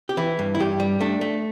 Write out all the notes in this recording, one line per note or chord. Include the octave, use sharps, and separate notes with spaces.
G4
E3 E4
G2
E4
G2 G4
G3
A3 D4
A3